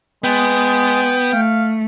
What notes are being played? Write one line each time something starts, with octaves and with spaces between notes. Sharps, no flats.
G#3 B3 G5
A3 F5